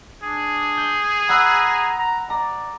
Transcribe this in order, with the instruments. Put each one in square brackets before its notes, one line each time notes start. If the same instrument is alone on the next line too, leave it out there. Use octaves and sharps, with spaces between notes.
[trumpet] D4 [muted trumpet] G#4
[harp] G6
[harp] F#5 B5 E6 [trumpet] A#5
[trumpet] A#5
[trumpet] D5 [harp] A#5